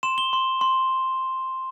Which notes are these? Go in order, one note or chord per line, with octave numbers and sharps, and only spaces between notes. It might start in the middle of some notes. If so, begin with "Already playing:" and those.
C6 E7
G7
C6
C6